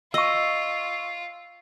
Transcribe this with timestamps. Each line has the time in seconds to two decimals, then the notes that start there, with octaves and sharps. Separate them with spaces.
0.14 F4 D#5 C#6 E6